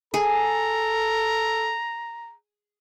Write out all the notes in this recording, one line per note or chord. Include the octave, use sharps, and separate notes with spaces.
G#4 A4 A#5